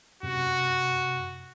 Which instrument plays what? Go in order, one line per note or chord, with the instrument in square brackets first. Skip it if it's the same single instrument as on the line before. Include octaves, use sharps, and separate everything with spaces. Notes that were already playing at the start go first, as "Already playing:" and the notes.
[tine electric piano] F#2 C3 [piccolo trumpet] F#4